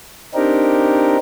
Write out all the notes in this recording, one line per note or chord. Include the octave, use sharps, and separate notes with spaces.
C4 D4 D#4 G4 A#4